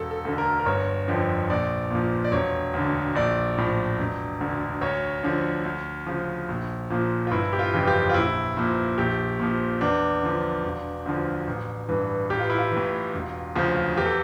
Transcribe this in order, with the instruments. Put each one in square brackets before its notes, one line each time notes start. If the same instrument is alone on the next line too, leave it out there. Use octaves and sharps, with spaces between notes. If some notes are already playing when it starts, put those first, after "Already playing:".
Already playing: [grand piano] E1 A4
A4
D2 D3 A4
A#4
A#4
G1 C#5
F2 D3 F3
A#1 D5
A#2 F3
D5
E1 C#5
D2 D3
A#1 D5
A2 F3
E1
D2 D3
D2 C#5
D3 F3
D2
C#3 F3
A#1
A#2 F3
F4
G1 E4
G4
F4
F2 C#3 E3
G4
F4
A#1 E4
A#2 F3
A#1 G4
A#2 F3
E2 D4
D3 F3
E1
D2 D3 F3
A1
G2 E3
A1 G4
F4
E4
F4
E3
A2
E1
D2 C#3 F3
E2 G4
A4